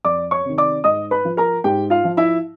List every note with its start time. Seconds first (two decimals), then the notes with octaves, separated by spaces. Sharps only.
0.05 F2 D5 D6
0.31 C#5 C#6
0.45 C3 D#3
0.58 D5 D6
0.84 G#2 D#5 D#6
1.11 B4 B5
1.25 F3
1.37 A#4 A#5
1.64 G#2 G4 G5
1.90 F4 F5
2.04 F3
2.17 E4 E5